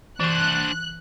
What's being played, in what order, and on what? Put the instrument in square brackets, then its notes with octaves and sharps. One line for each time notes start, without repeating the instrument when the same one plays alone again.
[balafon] E3 C#6 [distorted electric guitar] D4 C5 [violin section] F#6